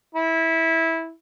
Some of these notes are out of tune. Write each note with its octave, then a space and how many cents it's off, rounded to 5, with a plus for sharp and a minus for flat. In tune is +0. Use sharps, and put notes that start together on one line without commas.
E4 -15